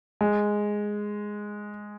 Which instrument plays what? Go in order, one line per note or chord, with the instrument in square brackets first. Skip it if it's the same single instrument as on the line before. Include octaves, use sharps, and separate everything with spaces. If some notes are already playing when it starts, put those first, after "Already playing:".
[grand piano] G#3